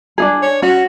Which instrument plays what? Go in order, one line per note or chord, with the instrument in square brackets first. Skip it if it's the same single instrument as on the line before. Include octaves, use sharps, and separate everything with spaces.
[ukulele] D4 D#4 G#4
[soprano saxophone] C#5
[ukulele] C#4 [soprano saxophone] F#4